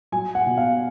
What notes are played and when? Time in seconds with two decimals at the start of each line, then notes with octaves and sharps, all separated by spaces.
0.12 F#3 G#5
0.35 F#5
0.46 B2
0.57 F5